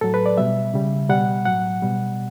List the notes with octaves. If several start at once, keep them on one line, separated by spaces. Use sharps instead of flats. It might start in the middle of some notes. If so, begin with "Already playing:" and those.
A2 F#3 A4
B4
D5
B2 G3 E5
C#3 G3
B2 G3 F#5
A2 F#3 F#5
B2 G3